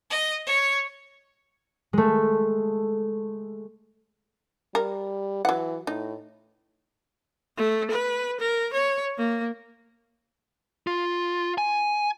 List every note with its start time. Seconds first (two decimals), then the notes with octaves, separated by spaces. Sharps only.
0.10 D#5
0.47 C#5
1.93 G#3 A3
4.75 G3 A#4
5.45 E3 F#3 F#5
5.87 A2 D#4
7.57 A3
7.90 B4
8.40 A#4
8.73 C#5
9.18 A#3
10.87 F4
11.58 G#5